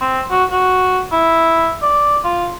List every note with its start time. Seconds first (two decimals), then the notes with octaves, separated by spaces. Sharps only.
0.01 C4
0.31 F#4
0.52 F#4
1.12 E4
1.82 D5
2.25 F4